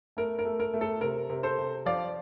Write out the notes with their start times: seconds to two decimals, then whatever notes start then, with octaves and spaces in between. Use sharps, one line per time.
0.17 A3 A#4
0.39 A#4
0.45 A3
0.60 A#4
0.74 A3
0.81 A4
1.01 C3 A#4
1.30 C3
1.43 A4 C5
1.58 C3
1.86 F3 D5 F5